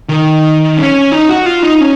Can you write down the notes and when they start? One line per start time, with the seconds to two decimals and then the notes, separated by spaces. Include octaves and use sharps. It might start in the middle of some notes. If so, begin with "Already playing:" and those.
0.09 D#3
0.77 C#4
1.12 D#4
1.29 F#4
1.46 F4
1.63 D#4
1.81 C#4